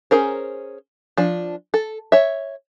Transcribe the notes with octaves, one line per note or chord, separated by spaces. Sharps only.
C#4 G#4 A#4 C5
F3 D4
A4
C#5 E5